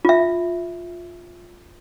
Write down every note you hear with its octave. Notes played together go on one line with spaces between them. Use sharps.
F4 E5